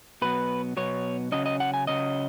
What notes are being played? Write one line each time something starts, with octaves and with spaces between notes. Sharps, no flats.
B2 F#3 B3 B4
B2 F#3 B3 C#5
C#3 F#3 C#4 D#5
D#5
F#5
G#5
C#3 F#3 C#4 D#5